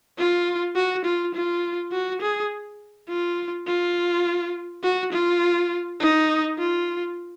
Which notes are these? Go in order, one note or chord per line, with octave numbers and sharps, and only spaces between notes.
F4
F#4
F4
F4
F#4
G#4
F4
F4
F#4
F4
D#4
F4